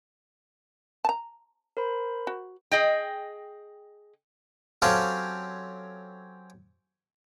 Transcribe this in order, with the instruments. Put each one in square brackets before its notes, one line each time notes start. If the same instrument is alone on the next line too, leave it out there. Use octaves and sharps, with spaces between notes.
[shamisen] A5 A#5
[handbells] A#4 C5 B5
[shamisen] F#4
[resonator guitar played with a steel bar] G#4 D#5 G5
[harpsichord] F#3 C4 C#4 G4 A4 F5